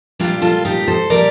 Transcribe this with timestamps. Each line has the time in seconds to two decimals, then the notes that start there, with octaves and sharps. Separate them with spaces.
0.19 A#2 G3 D4 F4
0.42 F4 A4
0.65 D#4 G4
0.88 A4 C5
1.10 A#2 G3 A#4 D5